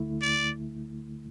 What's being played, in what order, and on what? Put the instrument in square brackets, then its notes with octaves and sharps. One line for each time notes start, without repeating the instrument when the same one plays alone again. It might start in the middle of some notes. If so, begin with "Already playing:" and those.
Already playing: [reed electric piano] D2 D3 A3 E4
[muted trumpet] D5